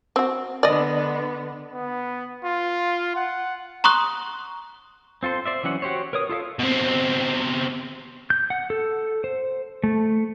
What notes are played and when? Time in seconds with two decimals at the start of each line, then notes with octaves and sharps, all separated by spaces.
0.16 C4 F#4
0.63 D3 B3 D5 D#5
1.73 B3
2.45 F4
3.16 F#5
3.84 A#5 C6 C#6 D#6 F#6
5.23 C4 F4 A4 C5
5.46 C5 D5 E5
5.63 E3 F#3 C#4 F#5
5.82 F#4 G4 C5 C#5
6.13 A#4 B4 C#5 D#6
6.29 F4 A4 E5 F5
6.59 B2 C4
8.30 G6
8.50 F#5
8.70 A4
9.24 C5
9.84 A3